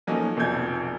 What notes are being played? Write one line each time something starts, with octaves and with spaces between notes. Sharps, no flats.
F3 F#3 A3 A#3 C#4 D#4
F1 A#1 F2 B2 G6 G#6